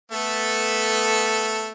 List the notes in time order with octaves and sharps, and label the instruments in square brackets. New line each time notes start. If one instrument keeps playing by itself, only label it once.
[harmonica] A3 B3 A4